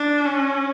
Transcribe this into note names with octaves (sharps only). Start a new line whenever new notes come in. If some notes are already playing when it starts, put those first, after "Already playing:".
Already playing: D4
C#4